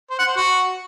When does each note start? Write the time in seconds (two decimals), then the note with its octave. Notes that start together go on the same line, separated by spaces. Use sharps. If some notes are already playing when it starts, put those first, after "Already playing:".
0.10 C5
0.19 F#5
0.27 C5
0.36 F#4